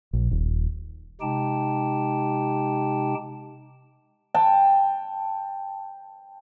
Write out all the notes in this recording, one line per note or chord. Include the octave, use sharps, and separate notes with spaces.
A#1
D#1
C3 G#3 D#4 G4 G5 A5
G5 A5